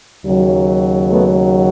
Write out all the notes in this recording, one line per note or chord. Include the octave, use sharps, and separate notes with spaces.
D#2 C#3 F#3
A3 B3